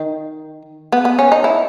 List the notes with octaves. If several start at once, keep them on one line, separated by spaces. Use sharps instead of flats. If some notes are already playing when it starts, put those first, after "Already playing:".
Already playing: D#3
B3
B3
C#4
D#4
E4